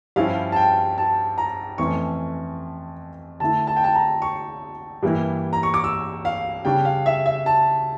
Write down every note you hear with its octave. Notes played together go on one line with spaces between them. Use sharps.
G2 F3 C#4 E4 F5
A5
G5
A5
A#5
F2 E3 A3 C#4 C#6
D3 A3 E4 A5
A5
G5
A5
A#5
C#6
G2 E3 A#3 E4
A#5
C#6
D6
E6
F5
C#3 G3 D4 G5
F5
E5
E5
A5